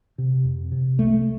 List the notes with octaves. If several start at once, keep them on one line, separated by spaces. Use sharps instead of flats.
C3
F2
C3
C2 A3